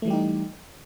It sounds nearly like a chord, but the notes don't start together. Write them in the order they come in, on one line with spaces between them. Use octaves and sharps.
A3 E3 G3 G4 D#4